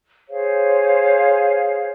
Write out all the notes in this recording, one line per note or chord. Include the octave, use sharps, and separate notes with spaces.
G#4 C5 C#5 F5